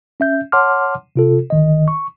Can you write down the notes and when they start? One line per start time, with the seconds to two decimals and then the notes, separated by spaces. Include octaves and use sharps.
0.20 C#4 E5 G6
0.52 C#5 F#5 A5 C6 D6 F6
1.16 C3 F4 A4
1.50 G1 D#3 D#5
1.88 C#6